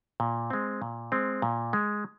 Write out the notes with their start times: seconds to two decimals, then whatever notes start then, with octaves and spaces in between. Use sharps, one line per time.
0.20 A#2
0.50 G#3 C4
0.82 A#2
1.12 G#3 C4
1.42 A#2
1.73 G#3